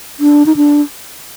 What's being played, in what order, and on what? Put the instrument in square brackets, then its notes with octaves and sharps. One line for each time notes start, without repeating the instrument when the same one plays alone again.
[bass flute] D4
D#4
D4